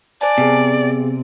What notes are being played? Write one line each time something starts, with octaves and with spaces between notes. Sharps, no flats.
C5 D5 G#5 A5
C3 B3 G#4